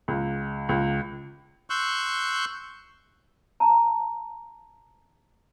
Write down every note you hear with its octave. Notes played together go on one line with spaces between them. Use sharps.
C#2
C#2
C6 C#6 E6 F#6 G6
A5 A#5